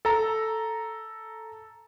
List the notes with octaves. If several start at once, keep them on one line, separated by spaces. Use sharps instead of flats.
A4 A#5